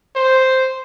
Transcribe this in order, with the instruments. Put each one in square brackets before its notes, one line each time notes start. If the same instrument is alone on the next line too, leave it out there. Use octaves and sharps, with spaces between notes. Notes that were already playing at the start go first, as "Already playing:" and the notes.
[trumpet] C5